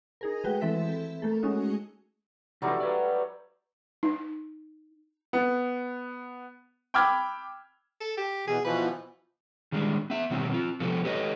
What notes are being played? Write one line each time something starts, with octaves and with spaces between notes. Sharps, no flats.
D#4 G#4 A#4
G#3 A3 F#4 B4 G5
E3 C4 A4 E5 B6
A3 A#3 A4
G#3 A3 C#4 D#4 F#4
C3 E3 F#3 G3 A3 D#4
B4 D5
D#4
B3
G5 B5 D6 E6 F6 G#6
A4
G4
E2 B2 E3 G#4
B2 E3 F3 B4
D#3 G3 G#3 D4
B3 E5
B2 D#3 F#3 G3 C4
C4 F4
C3 F3 B3 A4
G4 A4 B4 C#5 D#5